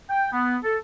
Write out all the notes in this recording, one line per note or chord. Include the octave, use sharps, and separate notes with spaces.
G5
B3
A4